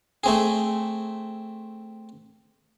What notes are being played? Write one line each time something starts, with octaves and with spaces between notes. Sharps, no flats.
A3 C4 G#4